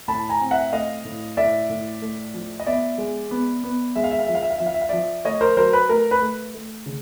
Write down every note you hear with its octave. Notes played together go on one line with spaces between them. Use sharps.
A2 A5 B5
G#5 A#5
C4
E5 F#5
A3 D#5 F5
A2
A2 D5 E5
A2
A3
F3
D#5
B3 D5 E5
G#3
B3
B3
G#3 E5
F5
E5
F5
F3 E5
F5
E5
F5
F3 E5
F5
E5
F5
F3 D5 E5
A3 C#5 D#5
A#4 C5
F#3 A#4 C5
B4
A3 A#4
B4
A3
A3
C#3